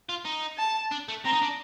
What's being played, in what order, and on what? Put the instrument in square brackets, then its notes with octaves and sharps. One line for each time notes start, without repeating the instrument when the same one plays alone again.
[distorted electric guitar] F4
D#4
[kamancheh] A5
[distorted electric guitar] D4
A3
[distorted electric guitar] C4 [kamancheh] A#5
[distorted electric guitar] D#4
D4